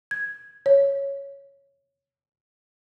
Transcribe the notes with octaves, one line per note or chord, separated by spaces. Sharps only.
G#6
C#5